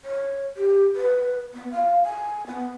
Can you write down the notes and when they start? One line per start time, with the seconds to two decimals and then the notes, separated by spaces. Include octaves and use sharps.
0.05 C#5
0.57 G4
0.96 B4
1.54 B3
1.72 F5
2.05 G#5
2.47 B3